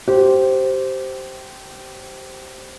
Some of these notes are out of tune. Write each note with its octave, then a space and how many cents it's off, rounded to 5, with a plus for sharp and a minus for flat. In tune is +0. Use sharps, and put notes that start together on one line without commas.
G4 -20 C5 +0